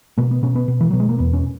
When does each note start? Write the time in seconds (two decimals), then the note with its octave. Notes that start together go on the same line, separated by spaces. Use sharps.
0.18 B2 A#3
0.31 B3
0.43 B2 C#4
0.55 B3
0.68 B2
0.81 E3
0.90 B2 F#3
1.00 G#3
1.09 A#3
1.18 E2 B3
1.33 C#4